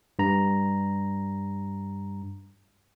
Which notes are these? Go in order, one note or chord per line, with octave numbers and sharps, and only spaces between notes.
G2 A#5